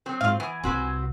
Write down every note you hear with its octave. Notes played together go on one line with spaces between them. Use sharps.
F#3 C4
G#2 F4 F5
E3 B3 G#5
C2 C3 C4 F#4 B4